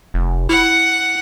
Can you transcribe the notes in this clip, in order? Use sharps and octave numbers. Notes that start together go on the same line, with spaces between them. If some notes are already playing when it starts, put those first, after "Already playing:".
F1
E4 F#5